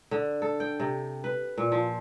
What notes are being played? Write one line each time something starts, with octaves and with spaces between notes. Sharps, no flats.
D3
A4
G5
C3
B4
A#2
F3